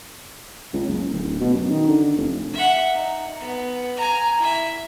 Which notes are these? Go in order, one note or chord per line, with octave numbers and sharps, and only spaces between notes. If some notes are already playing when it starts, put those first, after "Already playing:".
C#2
F#1
D1
B2
F#2
D#3
D3
F1
E5 F#5
D#4
B3
G#5 A#5
E4 E5